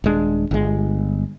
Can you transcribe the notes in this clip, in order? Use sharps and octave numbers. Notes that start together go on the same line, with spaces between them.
D#1 G#3 D4
G1 G#3